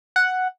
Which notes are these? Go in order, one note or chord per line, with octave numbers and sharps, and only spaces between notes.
F#5